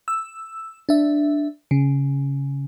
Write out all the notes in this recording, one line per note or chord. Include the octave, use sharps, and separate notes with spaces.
E6
D4 E5
C#3